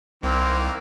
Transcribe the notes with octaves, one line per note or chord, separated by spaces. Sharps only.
C2 D#3 E3 A#3 C4